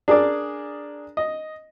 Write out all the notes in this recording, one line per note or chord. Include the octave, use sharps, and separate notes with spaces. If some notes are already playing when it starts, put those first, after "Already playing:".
D4 G#4 A#4 D5
D#5